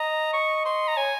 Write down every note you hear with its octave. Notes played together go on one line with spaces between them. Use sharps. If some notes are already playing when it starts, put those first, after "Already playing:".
Already playing: D#5 A#5
C#6
C6
A#5
C#5 G#5